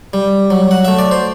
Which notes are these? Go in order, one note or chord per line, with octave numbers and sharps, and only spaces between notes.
G3
F#3
F#5
A3 E5
D5
C5